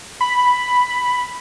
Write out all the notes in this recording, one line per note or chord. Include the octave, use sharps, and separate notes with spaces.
B5